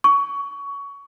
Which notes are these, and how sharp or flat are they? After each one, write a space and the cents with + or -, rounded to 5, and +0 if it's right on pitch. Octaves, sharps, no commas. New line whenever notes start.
C#6 +20